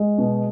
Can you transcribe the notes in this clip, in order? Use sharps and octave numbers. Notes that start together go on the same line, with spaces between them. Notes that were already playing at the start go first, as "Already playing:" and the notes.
Already playing: G#3
B2